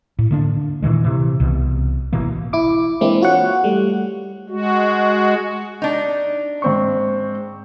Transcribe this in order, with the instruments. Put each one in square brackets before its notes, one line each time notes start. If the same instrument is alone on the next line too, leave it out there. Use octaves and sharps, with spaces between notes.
[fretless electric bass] A2
D3 A#3 D4
A#2 D#3 E3 G#3
C3 E3
C2 B2
G#1 B2 E3 A#3
[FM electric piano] E4 D6
E3 G#3 A#3 C4 D4 E4
F4 F#4 C#5 F#5
G3 A3
[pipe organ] G#3 F#4
[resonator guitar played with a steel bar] D4 D#4
[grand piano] G#2 C4 C#6